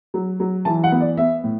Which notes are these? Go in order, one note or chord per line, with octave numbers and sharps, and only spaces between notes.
F#3
F#3
E3 A5
F#5
B3
D5
B3 E5
A2